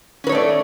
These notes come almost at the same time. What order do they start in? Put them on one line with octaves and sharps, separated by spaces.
C#4 B4 C#5 A3 D5